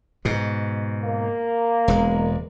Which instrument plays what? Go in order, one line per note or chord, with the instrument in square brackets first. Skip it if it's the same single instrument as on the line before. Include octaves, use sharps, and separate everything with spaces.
[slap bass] G#2 B2
[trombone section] A#3
[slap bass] E1 G#3